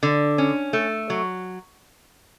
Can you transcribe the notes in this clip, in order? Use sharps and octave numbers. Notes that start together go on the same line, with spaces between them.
D3
C#4
A3
F#3